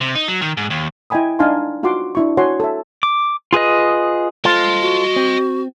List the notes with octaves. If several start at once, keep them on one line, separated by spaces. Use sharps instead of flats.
C3
D#4
F#3
D#3
G#2
D#2
E4 D#5 G5 G#5 B5 D#6
D4 D#4 F5 G#5 A5 C6
D#4 F4 F#4 F#5 C6 D6
D4 E4 C#6
F#4 C#5 F#5 G#5 C6
A4 E5
D6
F4 G#4 B4 D#5
F4 A4 C5 D#5 C6
F#4
C4